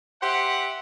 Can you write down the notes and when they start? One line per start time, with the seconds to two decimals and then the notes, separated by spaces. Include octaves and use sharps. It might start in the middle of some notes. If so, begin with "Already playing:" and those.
0.22 G4 C5 E5 F#5